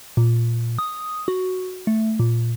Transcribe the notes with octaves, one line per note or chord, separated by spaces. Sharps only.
A#2
D#6
F#4
A3
A#2